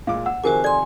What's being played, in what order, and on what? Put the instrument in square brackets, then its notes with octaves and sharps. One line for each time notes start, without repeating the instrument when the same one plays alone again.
[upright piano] A#2 G#3 D6 [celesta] F5
[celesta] F#5 [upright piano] E6
[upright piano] C3 D#3 F3 [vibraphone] F#4 C5 G#5 [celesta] G#4 A#4
[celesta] A4 D5 G#6 [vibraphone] G#5 C6